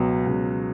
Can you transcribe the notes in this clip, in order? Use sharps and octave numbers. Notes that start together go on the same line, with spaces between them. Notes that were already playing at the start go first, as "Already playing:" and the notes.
Already playing: C#2 B2 F#3 B3
C#2